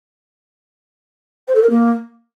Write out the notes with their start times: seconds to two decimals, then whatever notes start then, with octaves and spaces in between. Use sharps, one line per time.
1.47 C5
1.55 A4
1.62 A#4
1.70 A#3